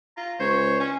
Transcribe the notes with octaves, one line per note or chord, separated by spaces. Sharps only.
F4 A#5
C#2 C5 C#5
C#4